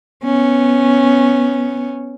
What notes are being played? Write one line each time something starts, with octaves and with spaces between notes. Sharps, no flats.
B3 C#4